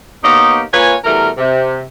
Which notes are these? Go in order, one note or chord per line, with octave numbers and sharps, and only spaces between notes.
A#3 B3 D#4 G4 C#5 D#5
A#3 F4 B4 C#5 G#5
B2 E3 G3 A3 A#4
C3